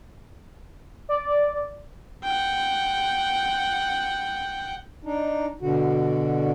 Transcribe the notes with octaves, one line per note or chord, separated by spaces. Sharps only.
D5
F#5 G5
D4 D#4
B2 D3 F#4